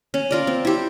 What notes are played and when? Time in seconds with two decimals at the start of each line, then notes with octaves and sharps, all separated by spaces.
0.14 C#4
0.31 F4 A#4 D5
0.47 C4
0.65 E4 G4